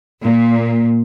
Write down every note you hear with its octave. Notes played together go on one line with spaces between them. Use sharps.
A#2